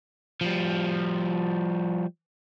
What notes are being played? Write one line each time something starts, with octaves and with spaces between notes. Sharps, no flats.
F3 G3